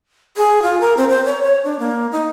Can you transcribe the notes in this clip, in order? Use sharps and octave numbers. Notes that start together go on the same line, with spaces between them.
G#4
F4
A#4
C4
C5
C#5
C#5
D4
A#3
D#4